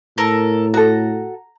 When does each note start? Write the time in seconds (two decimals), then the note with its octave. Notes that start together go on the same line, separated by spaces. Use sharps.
0.18 A2 A4 A#4
0.74 F#4 A4 A#5